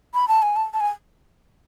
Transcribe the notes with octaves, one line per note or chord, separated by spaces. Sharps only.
B5
A5
G#5
A5
A5
G#5